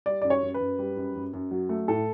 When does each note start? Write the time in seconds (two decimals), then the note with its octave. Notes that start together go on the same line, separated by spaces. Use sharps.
0.06 G3 D5
0.22 F#2 D5
0.30 C#5
0.43 F#2
0.54 B4
0.60 F#2
0.79 G3
0.97 F#2
1.15 F#2
1.33 F#2
1.51 F#3
1.69 A3
1.88 A2 A4